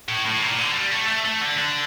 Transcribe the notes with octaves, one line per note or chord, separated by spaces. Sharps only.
A2
A2
A#2
D3
G3
A3
A3
A3
D3
D3